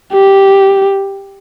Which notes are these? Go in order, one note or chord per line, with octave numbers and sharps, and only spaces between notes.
G4